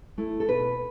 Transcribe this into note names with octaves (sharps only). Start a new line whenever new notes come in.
A3 E4
A4
B2 B4